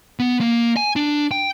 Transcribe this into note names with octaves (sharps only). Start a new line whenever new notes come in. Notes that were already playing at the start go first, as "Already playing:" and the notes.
B3
A#3
G#5
D4
G5